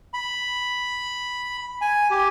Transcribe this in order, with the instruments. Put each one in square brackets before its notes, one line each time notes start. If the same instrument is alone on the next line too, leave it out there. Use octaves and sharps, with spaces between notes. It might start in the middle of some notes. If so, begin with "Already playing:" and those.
[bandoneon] B5
G#5
G4